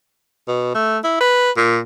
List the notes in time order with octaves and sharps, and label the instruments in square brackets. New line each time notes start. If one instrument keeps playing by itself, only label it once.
[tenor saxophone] B2
A3
E4
B4
A#2